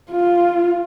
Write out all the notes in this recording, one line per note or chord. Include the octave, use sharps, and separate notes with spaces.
F4